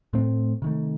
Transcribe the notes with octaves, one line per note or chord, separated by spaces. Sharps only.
A2 A3 C4
C3 D#3 A3